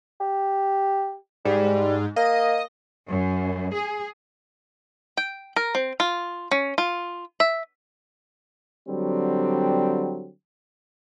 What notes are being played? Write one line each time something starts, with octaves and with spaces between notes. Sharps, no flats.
G4
G#2 G3
A#3 D#5
F#2
G#4
G5
A#4
C4
F4
C#4
F4
E5
D3 F#3 G3 C4